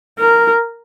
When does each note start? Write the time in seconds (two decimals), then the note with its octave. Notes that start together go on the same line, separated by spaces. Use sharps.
0.19 A#4